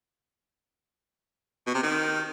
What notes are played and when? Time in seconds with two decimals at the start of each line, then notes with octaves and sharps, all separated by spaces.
1.67 B2
1.75 C3
1.83 D#3